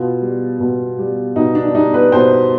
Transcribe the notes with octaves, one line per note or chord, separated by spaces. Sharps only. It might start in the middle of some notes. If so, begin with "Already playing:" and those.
Already playing: B2 F4
G3
B2
G3
B2 D#4
D4
D4
G3 D#4
B4
B2 C5